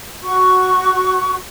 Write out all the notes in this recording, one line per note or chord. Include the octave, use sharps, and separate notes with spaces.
F#4 C#6